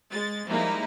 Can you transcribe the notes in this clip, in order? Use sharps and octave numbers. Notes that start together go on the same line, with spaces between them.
G#3 A6
F3 G3 G#3 A#3 D#4 E4